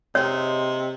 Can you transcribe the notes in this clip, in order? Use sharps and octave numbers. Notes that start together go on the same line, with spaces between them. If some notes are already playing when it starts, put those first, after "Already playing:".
C3 G#3 A#3 D#4 C#5